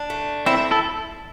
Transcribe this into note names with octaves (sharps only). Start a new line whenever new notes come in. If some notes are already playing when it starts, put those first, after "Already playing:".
Already playing: D4
A3
C4 E4 E5
E4 A4